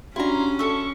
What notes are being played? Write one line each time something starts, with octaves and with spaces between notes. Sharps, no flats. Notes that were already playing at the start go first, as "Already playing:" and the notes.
C#4 D4 E4 F#4 G4 A#5 C6
A4 E5 C#6